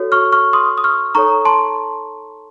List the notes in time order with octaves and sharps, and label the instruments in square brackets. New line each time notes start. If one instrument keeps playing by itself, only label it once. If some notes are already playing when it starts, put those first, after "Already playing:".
Already playing: [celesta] F#4 A4 C#5
C#6 F6
C#6 F6
C6 D#6
D#6
C#6 F6
D#4 A4 C#5 A#5 C#6
A5 C6